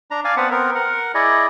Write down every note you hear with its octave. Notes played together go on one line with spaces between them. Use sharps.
D4 A#5
D5 F5 G#5
B3 C4 B4 F#5 A5
B3 C4 A#4
A#4 F#5
E4 G#4 D5 D#5